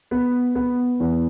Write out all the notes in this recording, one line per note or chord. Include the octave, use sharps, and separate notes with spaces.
B3
B3
E2